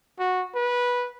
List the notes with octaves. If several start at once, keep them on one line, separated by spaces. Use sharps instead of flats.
F#4
B4